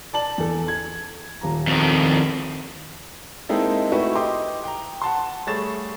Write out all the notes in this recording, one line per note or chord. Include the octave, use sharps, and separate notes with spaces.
D5 A5 F#7
E2 A4
G#6
D#1 A#5
F2 D#3
G#3 A#3 C4 D#4 E4 A4
A3 D#4 E4 F#4 G4 B4
G4 D#5 C6 D6
G5 A#5
F#5 A5 C6
G3 A3 G#4 C#5 A6 E7